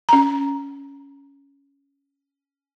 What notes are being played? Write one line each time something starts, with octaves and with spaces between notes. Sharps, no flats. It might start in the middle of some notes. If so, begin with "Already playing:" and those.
C#4 A#5